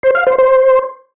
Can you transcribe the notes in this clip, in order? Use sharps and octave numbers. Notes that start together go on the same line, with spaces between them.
C5
F5
C5
C5